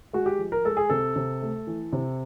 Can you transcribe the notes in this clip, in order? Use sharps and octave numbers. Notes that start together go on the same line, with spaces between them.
G#3 F#4
G4
F3
A#4
G#3 A4
G#4
C3 A4
C3
A3
E3
C3